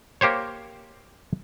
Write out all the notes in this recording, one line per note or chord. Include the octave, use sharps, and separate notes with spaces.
A#3 G4 C5 C#5